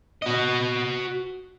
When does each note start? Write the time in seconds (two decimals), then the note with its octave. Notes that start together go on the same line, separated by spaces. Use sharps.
0.22 F#4 D#5